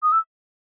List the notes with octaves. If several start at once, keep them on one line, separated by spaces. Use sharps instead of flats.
D#6
E6